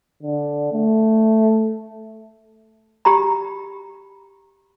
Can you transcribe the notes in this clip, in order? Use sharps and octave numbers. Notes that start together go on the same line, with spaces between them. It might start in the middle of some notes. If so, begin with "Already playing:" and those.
D3
A3
G4 A#5 B5